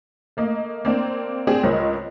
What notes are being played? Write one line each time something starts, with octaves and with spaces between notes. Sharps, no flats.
A3 A#3 D#5
A#3 C4 D4
C4 D4 G4 G#4
C#2 A#4 C5 C#5 D#5